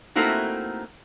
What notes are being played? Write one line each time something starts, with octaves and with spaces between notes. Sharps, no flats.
A3 A#3 C4 D#4 E4 F#4